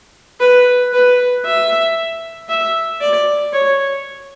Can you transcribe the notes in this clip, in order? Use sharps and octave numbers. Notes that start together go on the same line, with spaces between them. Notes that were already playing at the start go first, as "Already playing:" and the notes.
B4
B4
E5
E5
D5
C#5